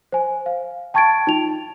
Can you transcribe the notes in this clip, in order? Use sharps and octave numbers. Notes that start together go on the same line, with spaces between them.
C5 G#5
F5
G5 A5 C#6 G#6 A6 D7
D#4 F4 F7